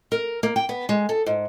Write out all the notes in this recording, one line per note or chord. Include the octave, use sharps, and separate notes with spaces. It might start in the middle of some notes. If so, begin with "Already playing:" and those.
A#4
A#3
G5
B3
G#3
A4
G#2